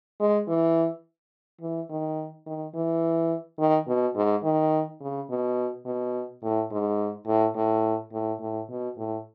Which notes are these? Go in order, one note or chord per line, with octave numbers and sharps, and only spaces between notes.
G#3
E3
E3
D#3
D#3
E3
D#3
B2
G#2
D#3
C#3
B2
B2
A2
G#2
A2
A2
A2
A2
B2
A2